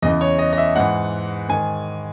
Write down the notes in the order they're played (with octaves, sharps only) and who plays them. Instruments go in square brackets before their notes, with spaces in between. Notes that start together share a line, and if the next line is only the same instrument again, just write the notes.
[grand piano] E2 C#3 E3 D#5
C#5
D#5
D#5
E5
G#2 E3 F#5
G#2 D#3 G#5